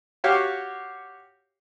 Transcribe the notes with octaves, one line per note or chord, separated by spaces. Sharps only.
F#4 G4 C#5 F5 F#5